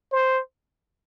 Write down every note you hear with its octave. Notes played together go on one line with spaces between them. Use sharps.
C5